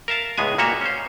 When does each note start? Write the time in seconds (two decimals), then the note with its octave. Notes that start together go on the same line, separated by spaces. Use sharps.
0.08 A#4 E5 F5 A5
0.38 C#2 A2 G#3 B3 G#4 G#5
0.58 A#2 A#3 F#4 C#5 E5
0.81 C#4 C5